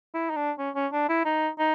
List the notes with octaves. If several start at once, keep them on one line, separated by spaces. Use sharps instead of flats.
E4
D#4
D4
C#4
C#4
D4
E4
D#4
D#4